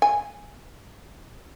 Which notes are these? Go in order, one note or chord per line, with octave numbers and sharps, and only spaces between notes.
G#5